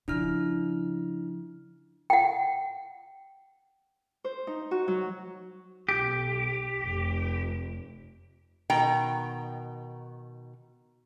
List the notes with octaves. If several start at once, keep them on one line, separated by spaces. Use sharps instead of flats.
C#3 F3 D4 E4 F6
F#5 G5
C5
D#4
F#4
F#3
B1 G4
F1
B2 D#3 G5 A#5